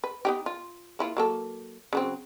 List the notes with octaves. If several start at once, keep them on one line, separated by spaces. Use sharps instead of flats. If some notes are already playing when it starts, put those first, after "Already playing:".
B4
B3 D#4 G4
F4
A#3 E4 F4
F#3 A#3 A4
C#3 F#3 C4